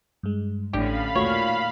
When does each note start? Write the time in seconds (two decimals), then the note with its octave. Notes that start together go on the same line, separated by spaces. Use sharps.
0.23 G2 G#3
0.73 A1 A2 D3 C#4 D4 G4 F5 B5
1.15 D#2 A#2 A3 F4 F#4 C#5